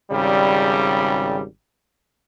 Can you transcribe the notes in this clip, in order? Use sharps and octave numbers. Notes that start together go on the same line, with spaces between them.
G#1 C#3 G3